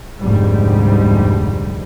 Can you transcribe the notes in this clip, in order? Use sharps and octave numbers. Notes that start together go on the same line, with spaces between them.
F1 D2 G#2 G3